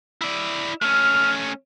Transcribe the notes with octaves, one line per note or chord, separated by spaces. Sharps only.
E4 D5
A3 C#4 F6